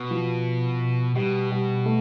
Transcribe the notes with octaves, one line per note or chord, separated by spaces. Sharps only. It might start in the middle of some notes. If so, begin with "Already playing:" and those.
Already playing: B2
F3
B2 G3
G3
A3